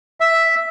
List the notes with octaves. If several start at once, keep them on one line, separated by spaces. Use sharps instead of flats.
E5